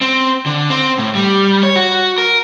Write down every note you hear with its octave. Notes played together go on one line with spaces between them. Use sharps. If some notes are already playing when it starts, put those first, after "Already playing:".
C4
D3
C4
A2
G3
C#5
F#4
A#4